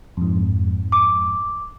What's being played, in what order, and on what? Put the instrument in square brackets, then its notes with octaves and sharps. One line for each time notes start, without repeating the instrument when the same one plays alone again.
[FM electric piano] F2 G#2
[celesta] D6